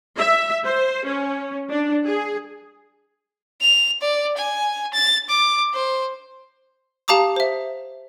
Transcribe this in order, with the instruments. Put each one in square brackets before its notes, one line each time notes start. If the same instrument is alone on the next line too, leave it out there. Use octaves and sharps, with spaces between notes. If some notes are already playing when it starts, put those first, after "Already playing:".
[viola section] E5
C5
C#4
D4
G#4
[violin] F7
D5
G#5
A6
D6
C5
[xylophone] G4 F5 A5 A#5 D6 D#6
C5 E5